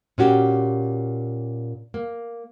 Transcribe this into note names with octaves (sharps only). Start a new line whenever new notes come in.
A#2 C#4 F#4 G4
A#3